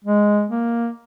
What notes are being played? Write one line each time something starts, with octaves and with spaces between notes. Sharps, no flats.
G#3
A#3